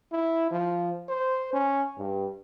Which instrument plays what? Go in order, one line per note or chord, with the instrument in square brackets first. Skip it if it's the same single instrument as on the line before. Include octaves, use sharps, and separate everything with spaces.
[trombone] E4
F3
C5
C#4
G2